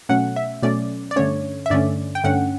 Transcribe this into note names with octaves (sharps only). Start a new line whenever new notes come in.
B2 F#3 A3 C#4 F#5
E5
B2 F#3 A3 C#4 D5
D5
G2 D3 A3 C#4 C#5
E5
G2 D3 A3 C#4 D5
G5
G2 D3 A3 C#4 F#5